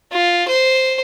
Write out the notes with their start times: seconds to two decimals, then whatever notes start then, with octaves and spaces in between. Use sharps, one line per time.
0.12 F4
0.48 C5